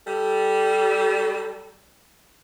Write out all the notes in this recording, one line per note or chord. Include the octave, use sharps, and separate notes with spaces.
G3 A4